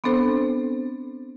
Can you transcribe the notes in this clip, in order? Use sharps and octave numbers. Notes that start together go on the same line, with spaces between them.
B3 C4 D4 A4 C5